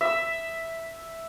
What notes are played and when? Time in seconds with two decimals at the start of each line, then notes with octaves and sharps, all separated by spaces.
0.01 E5 E6